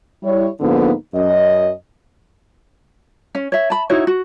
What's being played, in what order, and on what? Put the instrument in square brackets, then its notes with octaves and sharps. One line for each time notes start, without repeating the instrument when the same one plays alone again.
[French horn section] G3 E4 C#5
G#2 D3 F3 A#3 B3 D#4
F#2 D#5
[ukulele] C#4
C#5 E5
A5 B5
D#4 E4 F#4 C#5
F#4